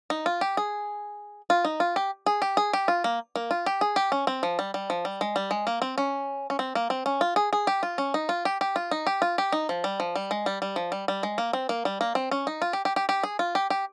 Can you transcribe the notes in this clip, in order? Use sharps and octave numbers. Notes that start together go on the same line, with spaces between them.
D#4
F4
G4
G#4
F4
D#4
F4
G4
G#4
G4
G#4
G4
F4
A#3
A#3
F4
G4
G#4
G4
C#4
C4
F3
G3
G3
F3
G3
G#3
G3
G#3
A#3
C4
C#4
C#4
C4
A#3
C4
C#4
F4
G#4
G#4
G4
F4
C#4
D#4
F4
G4
G4
F4
D#4
G4
F4
G4
D#4
F3
G3
F3
G3
G#3
G3
G3
F3
G3
G3
G#3
A#3
C4
A#3
G3
A#3
C4
C#4
D#4
F4
G4
G4
G4
G4
G#4
F4
G4
G4